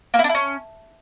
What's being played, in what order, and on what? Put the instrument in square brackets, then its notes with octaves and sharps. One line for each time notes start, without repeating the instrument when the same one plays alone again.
[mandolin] A#3
E4
D4
E4
C#4